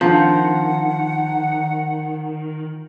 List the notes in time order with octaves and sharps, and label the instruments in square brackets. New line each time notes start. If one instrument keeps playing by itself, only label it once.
[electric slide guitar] D#3 [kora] F3 [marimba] C4 D4 [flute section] F#5